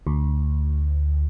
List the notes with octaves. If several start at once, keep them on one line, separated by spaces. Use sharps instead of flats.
D2